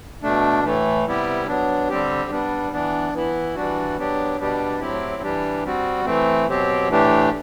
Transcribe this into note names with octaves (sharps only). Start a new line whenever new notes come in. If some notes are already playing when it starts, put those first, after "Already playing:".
B2 A3 D4
A2 E3 A3
C3 G3 B3 E4 G4
F#3 B3 D4
D3 G3 C4 G4
G3 B3 D4
E3 B3 D4
E3 B3 E4
E3 G3 D4 F#4
F#3 B3 D4 G4
B2 G3 B3 D4 G4
A2 F#3 C4 E4 G4
E3 G3 D4 G4
G3 C4 F#4
E3 A3 C4
B2 F#3 C4 G4
A2 E3 A3 D4 G4